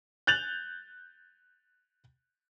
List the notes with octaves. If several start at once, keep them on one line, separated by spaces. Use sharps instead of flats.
F#6 G6 A6 F7 F#7